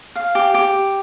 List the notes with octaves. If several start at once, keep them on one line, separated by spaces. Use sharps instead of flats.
F5
G4
G4